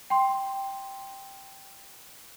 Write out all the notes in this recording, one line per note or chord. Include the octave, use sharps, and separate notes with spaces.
G5 C6